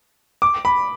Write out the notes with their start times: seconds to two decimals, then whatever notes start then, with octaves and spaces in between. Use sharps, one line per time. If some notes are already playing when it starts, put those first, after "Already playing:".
0.42 D6
0.65 B5